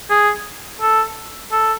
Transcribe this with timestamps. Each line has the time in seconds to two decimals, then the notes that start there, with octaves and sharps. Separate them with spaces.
0.10 G#4
0.81 A4
1.52 A4